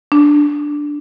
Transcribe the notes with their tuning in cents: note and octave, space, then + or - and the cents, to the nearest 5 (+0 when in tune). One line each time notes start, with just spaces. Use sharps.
D4 +0